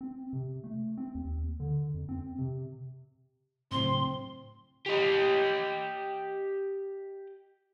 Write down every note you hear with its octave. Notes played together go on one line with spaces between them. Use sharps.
C4
C3
A3
C4
D#2
D3
F2
C4
C3
A2 C#3 F#3 C4 C6
G4 D#5